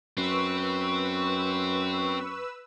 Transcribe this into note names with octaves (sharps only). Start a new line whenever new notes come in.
F#2 C4 B4 C#6 E6